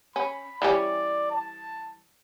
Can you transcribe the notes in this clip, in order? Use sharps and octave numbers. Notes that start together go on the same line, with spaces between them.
C#4 B5
E3 G3 C#4 D5
A5